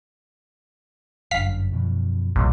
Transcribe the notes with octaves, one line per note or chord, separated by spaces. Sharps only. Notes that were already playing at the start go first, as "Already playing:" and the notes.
G1 F#2 D3 F5 B6
F#2 B2 F3
C2 F2 A#2 D#3